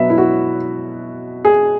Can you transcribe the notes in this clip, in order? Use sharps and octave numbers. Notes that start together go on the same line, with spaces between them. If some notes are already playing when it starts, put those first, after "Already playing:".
Already playing: B2 F#3 B3 E5
E4
F#4
G#4